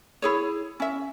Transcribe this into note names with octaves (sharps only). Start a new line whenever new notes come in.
E4 G#4 C#5
C#4 E5